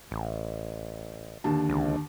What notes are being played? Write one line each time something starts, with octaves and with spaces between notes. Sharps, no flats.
A1
D#2 D3 A5
C#2